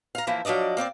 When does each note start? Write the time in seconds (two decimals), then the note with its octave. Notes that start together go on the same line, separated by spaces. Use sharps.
0.15 F5 A#5
0.27 E3 F3 A#3 E4
0.45 F3 F#3 D4 D5 D#5
0.77 A#3 C4 C#5 D5